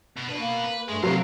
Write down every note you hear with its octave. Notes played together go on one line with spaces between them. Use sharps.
B2
B2 D4 B4
A#3
B4
G2 G#3 A3 G#4
C3 F3 F#3 A3 E4 F4 F5